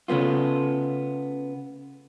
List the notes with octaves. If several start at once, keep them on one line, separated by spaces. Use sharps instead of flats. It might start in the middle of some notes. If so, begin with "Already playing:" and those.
C#3 A3 B3 F4